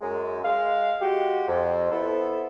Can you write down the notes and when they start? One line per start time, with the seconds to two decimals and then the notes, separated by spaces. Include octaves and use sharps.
0.01 F#2 G#3
0.43 G#3 F5
1.01 G#3 F#4 G4
1.48 F2
1.91 B3 E4 A4 C5